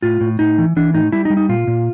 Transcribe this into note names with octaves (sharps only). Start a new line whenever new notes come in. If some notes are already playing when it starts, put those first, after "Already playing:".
A2 F4
A2
A2 D#4
E3
E3 D4
A2 D#4
G3 E4
D#4
G3
D#4
A#2 F4
A#2